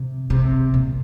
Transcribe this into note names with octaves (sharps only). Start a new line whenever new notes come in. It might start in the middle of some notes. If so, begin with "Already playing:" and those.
Already playing: C3
C3
A#2